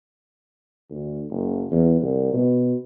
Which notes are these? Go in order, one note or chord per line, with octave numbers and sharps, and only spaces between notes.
D2
F#1
E2
C2
B2